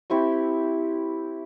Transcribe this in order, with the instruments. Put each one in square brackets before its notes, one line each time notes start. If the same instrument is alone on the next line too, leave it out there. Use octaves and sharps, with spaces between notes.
[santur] C4 E4 G4 C#6